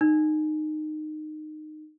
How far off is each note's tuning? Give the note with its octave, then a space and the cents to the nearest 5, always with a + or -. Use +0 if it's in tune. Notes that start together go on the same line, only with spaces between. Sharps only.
D#4 -20